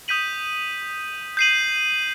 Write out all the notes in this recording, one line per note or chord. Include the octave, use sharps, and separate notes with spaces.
D#6 G6 B6 D#7 F#7
G6 C7 D#7 F#7